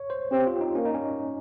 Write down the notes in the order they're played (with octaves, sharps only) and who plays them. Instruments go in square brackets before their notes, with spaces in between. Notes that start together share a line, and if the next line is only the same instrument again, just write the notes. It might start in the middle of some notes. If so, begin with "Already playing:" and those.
Already playing: [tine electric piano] C#5
C5
[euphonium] C4 [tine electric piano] G4
[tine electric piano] F4
D#4
[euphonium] A#3 [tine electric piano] C#4
[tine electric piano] D#4
C#4